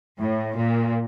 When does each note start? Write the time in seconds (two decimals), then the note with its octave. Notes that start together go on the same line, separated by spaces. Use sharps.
0.20 A2
0.56 A#2